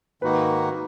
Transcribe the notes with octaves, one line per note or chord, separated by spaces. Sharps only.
G#2 D#3 A#3 D#4 F#4 B4